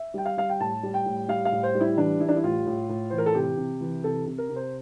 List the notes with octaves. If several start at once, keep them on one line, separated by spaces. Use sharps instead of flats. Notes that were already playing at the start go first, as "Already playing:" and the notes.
Already playing: E5
G3 G5
F5
G3 F5
G5
A2 A5
G3
G5
A2
G3 F5
F5
A2
C5
G3
E4
E3 D4
G3 E4
D4
E4
A2 F4
A2
A2
E3 C5
A#4
A4
C3 G4
C3
E3
C3 A4
C3
A#4
C3
C5